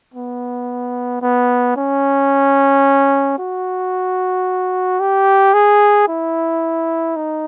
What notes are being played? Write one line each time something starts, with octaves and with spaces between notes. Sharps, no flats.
B3
B3
C#4
F#4
G4
G#4
E4
D#4